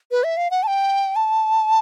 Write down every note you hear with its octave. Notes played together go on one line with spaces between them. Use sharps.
B4
E5
F5
F#5
A5
G5
A5